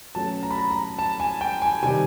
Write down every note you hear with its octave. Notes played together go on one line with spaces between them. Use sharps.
B2 F#3 A3 C#4 A5
A#5
B5
A#5
A#5
A5
G#5
G5
G#5
C3 D#3 G3 C4 G#5